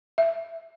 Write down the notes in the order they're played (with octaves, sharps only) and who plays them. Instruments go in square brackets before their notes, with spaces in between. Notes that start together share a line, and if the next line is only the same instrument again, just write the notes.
[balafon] E5